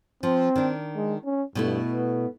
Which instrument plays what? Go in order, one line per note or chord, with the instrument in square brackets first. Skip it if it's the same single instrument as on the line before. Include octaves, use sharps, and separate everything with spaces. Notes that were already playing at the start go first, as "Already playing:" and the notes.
[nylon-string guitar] F3 [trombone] C4
[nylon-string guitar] D#3 D4
[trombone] G#3
C#4
[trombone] G2 [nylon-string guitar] B2 A3 E4
[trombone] B3